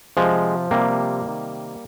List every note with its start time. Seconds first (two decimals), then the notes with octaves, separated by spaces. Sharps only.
0.17 C3 F3 G#3
0.71 C3 F3 G3 A#3
1.25 C3 D#3